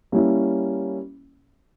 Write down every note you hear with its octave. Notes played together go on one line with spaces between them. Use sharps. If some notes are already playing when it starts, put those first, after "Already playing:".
G3 A#3 C#4 E4